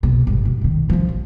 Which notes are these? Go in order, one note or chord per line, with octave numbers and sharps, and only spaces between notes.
A#1 B2
G1 G#2
G#2 B2
A#2 D#3
F3 C#4
A1